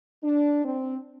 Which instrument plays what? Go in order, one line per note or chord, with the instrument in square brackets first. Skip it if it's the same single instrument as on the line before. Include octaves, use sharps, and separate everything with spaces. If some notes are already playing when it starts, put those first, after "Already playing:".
[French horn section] D4
C4